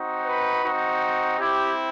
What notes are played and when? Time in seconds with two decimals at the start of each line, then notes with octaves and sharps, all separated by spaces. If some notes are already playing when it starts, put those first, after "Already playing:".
Already playing: C4 D#4 F#4
0.26 B4
0.64 C4 D#4 F#4
1.39 C4 E4 G4